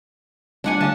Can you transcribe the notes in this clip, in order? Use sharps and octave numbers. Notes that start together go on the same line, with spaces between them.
G3 A3 D4 F#5 G#5
D3 F5 A5